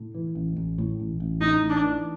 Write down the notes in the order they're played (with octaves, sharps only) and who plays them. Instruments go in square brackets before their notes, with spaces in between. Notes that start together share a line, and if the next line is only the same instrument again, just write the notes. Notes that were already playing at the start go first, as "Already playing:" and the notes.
Already playing: [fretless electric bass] A2
E3
A1
A1
A2
A1
A1
[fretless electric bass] A2 [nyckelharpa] D#4
[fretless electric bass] A1
[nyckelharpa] D4
[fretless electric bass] E3